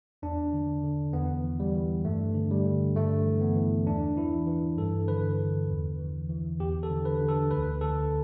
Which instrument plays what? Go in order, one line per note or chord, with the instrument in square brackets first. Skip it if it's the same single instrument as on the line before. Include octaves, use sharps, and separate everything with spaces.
[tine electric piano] E2 D4
D3
D3
E2 B3
E3
G3
E3
G2 A3
D3
G3
D3
G2 A3
E3
B3
E3
E2 D4
E3 E4
E3
G2 A4
D3 B4
D3
E2
E3
E3
E2 G4
A4
D3
B4
D3
A4
D2 B4
D3 A4